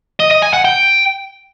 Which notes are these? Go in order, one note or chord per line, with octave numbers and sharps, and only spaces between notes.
D#5
D#5
G#5
F#5
G5